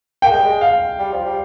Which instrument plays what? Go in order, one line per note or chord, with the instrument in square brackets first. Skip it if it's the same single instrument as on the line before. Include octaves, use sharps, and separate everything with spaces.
[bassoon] A#3 [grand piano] G5
[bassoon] G#3
G3
G#3
[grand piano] F5
[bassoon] G3
F3
G3